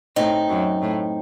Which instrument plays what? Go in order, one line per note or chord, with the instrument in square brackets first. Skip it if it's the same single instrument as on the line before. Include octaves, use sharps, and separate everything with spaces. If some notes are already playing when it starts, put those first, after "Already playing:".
[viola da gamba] A2 [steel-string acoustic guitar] C4 D#4
[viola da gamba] F#2
A2